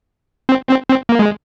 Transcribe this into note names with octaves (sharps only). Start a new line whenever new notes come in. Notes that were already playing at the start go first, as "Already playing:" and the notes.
C4
C4
C4
A#3
G#3